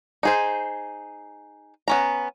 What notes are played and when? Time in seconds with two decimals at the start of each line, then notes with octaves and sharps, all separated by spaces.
0.23 D#4 G#4 C5
1.88 B3 C#4 A#5